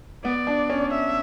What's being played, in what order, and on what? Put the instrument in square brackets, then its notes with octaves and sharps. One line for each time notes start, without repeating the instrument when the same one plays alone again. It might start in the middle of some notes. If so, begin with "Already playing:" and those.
[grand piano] B3 [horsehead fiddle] D5
[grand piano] D4
C#4
[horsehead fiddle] E5